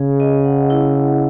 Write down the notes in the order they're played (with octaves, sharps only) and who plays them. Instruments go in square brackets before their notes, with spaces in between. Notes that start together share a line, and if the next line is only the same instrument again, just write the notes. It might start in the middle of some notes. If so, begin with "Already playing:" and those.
Already playing: [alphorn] C#3 [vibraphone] G#4
[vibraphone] D#5
F#5
E4
F#5